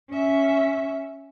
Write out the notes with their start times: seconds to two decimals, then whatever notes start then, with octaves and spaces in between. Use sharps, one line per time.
0.11 C#4 E5